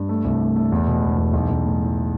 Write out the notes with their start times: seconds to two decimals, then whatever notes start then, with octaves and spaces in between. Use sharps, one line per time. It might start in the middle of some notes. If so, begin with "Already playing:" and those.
Already playing: G2
0.09 A3
0.25 C2
0.40 A3
0.56 A3
0.72 E2
0.87 B2
1.03 E1
1.18 E2
1.33 B1
1.49 B1
1.65 A2
1.81 E3